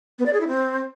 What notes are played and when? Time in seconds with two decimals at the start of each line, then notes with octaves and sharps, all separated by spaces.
0.19 B3
0.26 D5
0.33 G#4
0.40 E4
0.48 C4